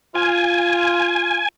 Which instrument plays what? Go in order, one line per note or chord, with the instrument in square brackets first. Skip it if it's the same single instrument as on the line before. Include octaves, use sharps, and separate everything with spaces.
[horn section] F4 [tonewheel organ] G#5